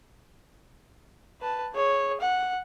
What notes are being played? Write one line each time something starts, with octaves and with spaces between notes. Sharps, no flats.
B4 A5
G#4 C#5
F#5